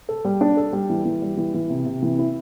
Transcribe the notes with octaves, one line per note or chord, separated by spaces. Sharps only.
A4
G3
D4
A4
G3
E3
E3
G3
E3
E3
C3
C3
E3
E4